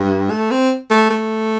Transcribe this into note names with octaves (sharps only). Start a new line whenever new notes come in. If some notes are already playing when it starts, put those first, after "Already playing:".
Already playing: G2
A3
C4
A3
A3